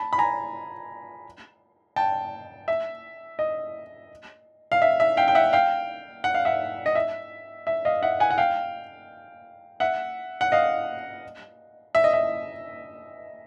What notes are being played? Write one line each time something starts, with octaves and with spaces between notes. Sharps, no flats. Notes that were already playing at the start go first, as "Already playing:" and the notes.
Already playing: A5 B5
B5
G#5 A#5
G5 A5
E5
D#5
F5
E5
E5
F5 G5
G5
E5 F#5
F5 G5
F#5
F5
E5 F#5
D#5
E5
E5
D#5 F5
E5 F#5
F#5 G#5
F#5
F5 G5
E5 F#5
F#5
D#5 F5
E5
D#5
E5